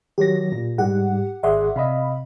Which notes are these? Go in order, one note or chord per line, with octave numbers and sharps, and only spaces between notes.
D#3 F#3 G4 A#6
A#2
G#2 G3 G4 F#5
G#1 G#4 D5 E5 F#5 C6
C3 D#5 F5 B5